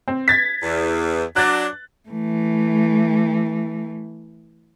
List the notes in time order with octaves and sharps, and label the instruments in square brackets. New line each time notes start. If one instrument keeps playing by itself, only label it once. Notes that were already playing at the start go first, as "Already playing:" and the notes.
[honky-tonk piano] C4
G#6 A6 B6
[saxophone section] E2
[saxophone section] F#3 D4 [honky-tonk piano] F#6 A6
[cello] E3 A3